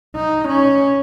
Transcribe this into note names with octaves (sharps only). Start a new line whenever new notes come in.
D#4
C#4